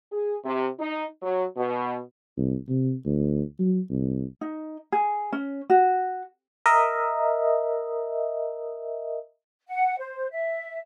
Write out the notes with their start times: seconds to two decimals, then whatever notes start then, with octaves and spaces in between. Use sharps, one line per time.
0.12 G#4
0.45 C3
0.80 D#4
1.23 F#3
1.57 B2
2.37 C2
2.68 C3
3.05 D2
3.59 F#3
3.90 C2
4.41 D#4
4.92 G#4
5.32 C#4
5.70 F#4
6.66 A#4 D#5 E5
9.68 F#5
9.99 C5
10.31 E5